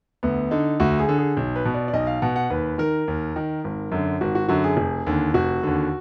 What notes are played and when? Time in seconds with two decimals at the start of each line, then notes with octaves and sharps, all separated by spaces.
0.23 D2 B3
0.51 D3 D#4
0.80 D2 F#4
0.99 G#4
1.09 D3
1.18 G#4
1.37 B1
1.56 B4
1.65 B2
1.74 D5
1.88 D5
1.93 B1 D#5
2.07 F5
2.22 B2 F#5
2.36 F#5
2.50 D#2 B4
2.78 D#3 A#4
3.08 D#2
3.36 D#3
3.64 G#1
3.92 F#2 D3
4.21 G#1 F#4
4.35 F#4
4.48 F#2 D3 F#4
4.64 G#4
4.77 F1
5.06 D#2 D3
5.34 F1 F#4
5.63 D#2 D3